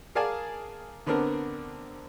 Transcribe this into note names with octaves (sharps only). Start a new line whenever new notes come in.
G#4 A#4 D5 F5 G#5 A5
D3 B3 C4 D4 A#4